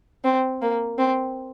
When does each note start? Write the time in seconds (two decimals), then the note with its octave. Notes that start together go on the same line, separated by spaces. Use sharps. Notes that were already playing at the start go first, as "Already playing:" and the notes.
0.24 C4
0.62 A#3
0.98 C4